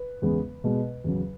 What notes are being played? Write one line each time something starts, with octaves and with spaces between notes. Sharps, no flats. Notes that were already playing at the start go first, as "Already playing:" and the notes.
Already playing: B4
E2 C#3 G#3 B3
B2 G#3 B3
E2 C#3 F#3